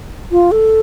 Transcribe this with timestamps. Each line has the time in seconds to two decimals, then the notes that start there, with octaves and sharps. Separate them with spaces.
0.32 F4
0.52 A4